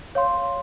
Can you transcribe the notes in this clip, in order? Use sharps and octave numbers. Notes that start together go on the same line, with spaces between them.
C#5 F5 C6